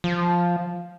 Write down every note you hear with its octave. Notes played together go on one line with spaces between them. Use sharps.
F3